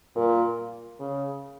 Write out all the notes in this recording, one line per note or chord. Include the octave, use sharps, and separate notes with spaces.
A#2 A#4
C#3